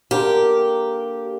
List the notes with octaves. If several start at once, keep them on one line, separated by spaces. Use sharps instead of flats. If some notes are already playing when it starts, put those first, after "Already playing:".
D3 A#3 G4 A#4